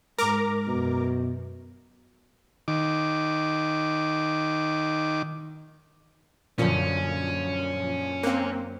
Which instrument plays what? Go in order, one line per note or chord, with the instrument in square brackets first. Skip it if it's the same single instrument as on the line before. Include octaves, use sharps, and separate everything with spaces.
[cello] G#2 [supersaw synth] A#4 A#5 D6
[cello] F#2 [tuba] B2
[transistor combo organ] D#3 D6
[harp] F#2 D3 F#3 [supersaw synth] A#2 F3 [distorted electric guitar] C#4
[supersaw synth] A#3 C4 [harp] F#6